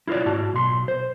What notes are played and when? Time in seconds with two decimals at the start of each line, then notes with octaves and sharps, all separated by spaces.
0.07 E4 F4 A4 C#5 D5
0.26 G#2 F#4 A5
0.53 B1 C6
0.88 C5